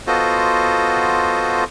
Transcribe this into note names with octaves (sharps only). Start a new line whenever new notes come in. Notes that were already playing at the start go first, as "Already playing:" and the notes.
B3 F4 F#4 A4 C5 D#5